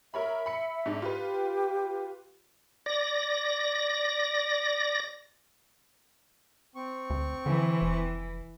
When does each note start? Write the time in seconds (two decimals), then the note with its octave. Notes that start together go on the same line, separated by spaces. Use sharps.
0.14 A#4 C#5 E5 B5
0.46 B5 C#7
0.86 G#2 D4
1.02 F4 G4 B4
2.86 D5 A#6
6.75 C4 C#6
7.10 D2
7.46 D3 E3
7.82 F1